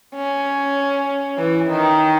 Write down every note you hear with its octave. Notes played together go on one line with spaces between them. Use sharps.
C#4
E3
D#3